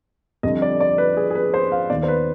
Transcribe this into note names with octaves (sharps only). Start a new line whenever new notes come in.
F2 D3 G3 D#5
D5
D5
B4
G#4
G#4
B4
C5
F5
D#2 D#3 B3 D5
C5
B4